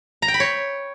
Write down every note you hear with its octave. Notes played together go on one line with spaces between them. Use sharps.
A#5
G5
B5
C#5